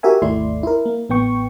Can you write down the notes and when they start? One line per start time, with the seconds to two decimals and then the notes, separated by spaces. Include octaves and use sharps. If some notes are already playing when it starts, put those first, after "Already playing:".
0.03 F#4 G4 A#4 E5 G#5
0.22 G#1 D#2 A3 E4 D5 C6
0.63 E4 A#4
0.86 A#3
1.09 A1 B3 G5 C#6